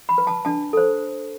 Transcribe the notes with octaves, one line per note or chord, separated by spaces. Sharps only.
B5
B4
A5
D4 A5
A4 C5